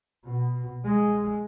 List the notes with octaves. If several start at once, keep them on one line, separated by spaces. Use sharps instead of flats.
B2
G#3